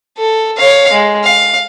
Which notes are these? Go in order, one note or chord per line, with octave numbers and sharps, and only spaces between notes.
A4
C#5 F5
G#3
F5